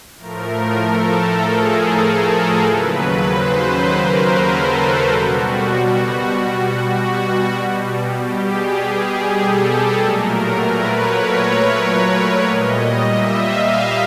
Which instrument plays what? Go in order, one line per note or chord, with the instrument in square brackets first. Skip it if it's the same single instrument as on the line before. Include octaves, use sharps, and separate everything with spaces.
[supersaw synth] A2 F3 A3 A#4
A4
G#4
A4
A#4
D#2 C#3 F#3 B4
C5
A#4
A4
B2 F#4
G3
F#4
B2 G3
G4
G#4
G#4
A4
A#2 F#3 A3 A#4
B4
C#5
A#2 G3 D#5
E5
F5